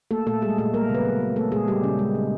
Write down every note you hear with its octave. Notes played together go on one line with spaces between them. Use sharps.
A3 A#3 A4
A#2 A3 A4
G3 G#3 G#4
A#2 A3 A4
A3 A#3 A#4
C#3
B3 B4
F#3
C#3
A3 A#3 A4
A#2 G#3 G#4
G3 G4
A#2 C#3 C#4
G#3
C#3